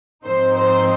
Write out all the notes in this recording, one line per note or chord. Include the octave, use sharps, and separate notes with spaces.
G#2 F3 C4 D#4 C5
C5